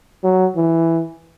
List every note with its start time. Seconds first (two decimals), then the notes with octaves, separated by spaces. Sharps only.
0.23 F#3
0.56 E3